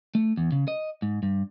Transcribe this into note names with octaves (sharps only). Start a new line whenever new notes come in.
A3
E2
C#3
D#5
G#2
G2